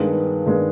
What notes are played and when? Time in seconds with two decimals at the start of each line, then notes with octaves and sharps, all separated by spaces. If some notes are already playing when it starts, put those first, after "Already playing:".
Already playing: G2 D#3 G#3 B3
0.46 G2 D#3 G#3 B3